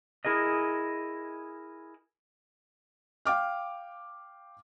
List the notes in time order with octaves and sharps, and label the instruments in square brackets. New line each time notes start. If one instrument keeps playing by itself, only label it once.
[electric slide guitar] E4 G#4 A#4 D#5
[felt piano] F5 G5 D6 F6